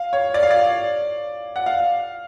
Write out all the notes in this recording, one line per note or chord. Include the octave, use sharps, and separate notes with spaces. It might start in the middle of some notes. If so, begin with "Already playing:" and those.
Already playing: F5
C#5
D5
F5
D5
F#5
F5